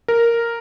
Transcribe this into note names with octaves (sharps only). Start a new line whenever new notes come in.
A#4